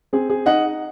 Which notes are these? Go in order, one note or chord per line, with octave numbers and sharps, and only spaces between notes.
C4 G#4
G#4
D#4 D#5 F#5